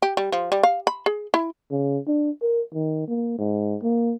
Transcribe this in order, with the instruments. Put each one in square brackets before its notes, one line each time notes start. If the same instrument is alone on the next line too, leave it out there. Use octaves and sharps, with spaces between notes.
[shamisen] G4
G3
F3
G3
F5
B5
G#4
E4
[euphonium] C#3
D4
A#4
D#3
A#3
G#2
A#3